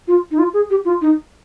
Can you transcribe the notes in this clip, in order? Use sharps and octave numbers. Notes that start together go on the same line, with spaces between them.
F4
D#4
F4
G#4
G4
F4
D#4